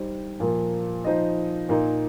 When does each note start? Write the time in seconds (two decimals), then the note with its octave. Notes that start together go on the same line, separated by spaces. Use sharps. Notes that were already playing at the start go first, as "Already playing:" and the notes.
Already playing: G3 D#4 C5
0.40 A#2 F3 A#3
1.04 F3 D#4 C5 D#5
1.69 A#2 A#3 D#4